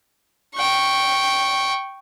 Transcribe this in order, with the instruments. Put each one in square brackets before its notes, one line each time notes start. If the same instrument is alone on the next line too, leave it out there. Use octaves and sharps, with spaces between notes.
[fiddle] G5 C#6